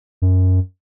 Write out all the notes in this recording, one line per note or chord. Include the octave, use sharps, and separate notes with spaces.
F#2